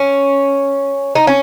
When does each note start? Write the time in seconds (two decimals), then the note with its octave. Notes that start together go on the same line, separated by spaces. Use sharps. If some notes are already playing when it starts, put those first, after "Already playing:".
Already playing: C#4
1.15 D#4
1.27 C#4